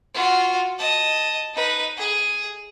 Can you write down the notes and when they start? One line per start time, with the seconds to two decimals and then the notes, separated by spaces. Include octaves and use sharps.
0.14 F4 F#4
0.78 D#5 A5
1.54 D#4 B4
1.97 G#4